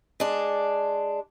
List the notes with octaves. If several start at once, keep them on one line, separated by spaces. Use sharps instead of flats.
G#3 D4